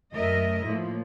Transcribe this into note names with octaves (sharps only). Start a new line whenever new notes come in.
F#2 A3 A#4 D#5 E5
A2 F3 A#3